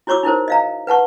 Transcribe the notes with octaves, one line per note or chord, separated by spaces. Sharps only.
E4 F#4 C#5 C#6 D6 E6
D#4 E4 A#4 C5
D#5 F5 A#5
B4 F#5 A5 C#6